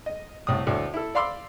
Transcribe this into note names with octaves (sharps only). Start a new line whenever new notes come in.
D#5
C2 A2 D#6
D2 A2 A4
E4 A4
D5 F5 B5 C6 D6 E6